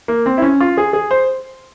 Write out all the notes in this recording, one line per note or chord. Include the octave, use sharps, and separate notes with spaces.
A#3
C4
E4
C#4
F4
G#4
G#4
C5